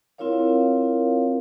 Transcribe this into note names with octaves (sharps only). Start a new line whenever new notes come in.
C4 E4 F4 A#4 C#5 F5